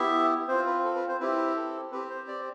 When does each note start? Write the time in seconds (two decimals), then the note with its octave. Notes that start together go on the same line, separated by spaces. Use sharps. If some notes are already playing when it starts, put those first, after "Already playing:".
Already playing: B3 E4 G4 E5
0.48 C4 F4 C5
0.66 B4
0.84 A4
0.96 B4
1.08 C5
1.20 C4 E4 G4 B4
1.56 A4
1.92 C4 G4 B4
2.10 C5
2.28 D5